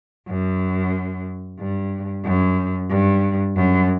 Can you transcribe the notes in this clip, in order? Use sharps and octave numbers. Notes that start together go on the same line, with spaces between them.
F#2
G2
F#2
G2
F#2